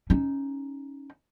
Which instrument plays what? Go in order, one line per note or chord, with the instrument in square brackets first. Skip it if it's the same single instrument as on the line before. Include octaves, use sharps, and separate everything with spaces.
[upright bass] C#4 D#4